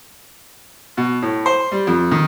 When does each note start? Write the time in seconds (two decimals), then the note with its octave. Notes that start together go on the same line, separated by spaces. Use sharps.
0.97 B2
1.22 A2
1.46 C5
1.72 G3
1.87 F2
2.11 D#3